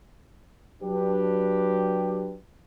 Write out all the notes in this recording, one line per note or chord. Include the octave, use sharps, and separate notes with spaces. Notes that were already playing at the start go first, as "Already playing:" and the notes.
F#3 D4 G4 B4